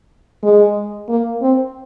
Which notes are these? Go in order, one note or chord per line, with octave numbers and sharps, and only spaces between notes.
G#3
A#3
C4